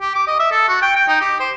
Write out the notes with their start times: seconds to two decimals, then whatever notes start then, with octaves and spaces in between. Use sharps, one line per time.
0.01 G4
0.15 D6
0.27 D#5
0.40 E5
0.52 A4
0.68 F#4
0.82 G5
0.96 G5
1.08 D#4
1.21 G4
1.40 C5